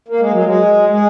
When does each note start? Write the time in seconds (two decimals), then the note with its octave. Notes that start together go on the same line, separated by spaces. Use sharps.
0.08 A#3
0.20 G#3
0.32 F#3
0.44 G#3
0.90 G#3